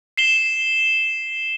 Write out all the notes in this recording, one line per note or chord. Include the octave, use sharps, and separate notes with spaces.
C7 E7 G7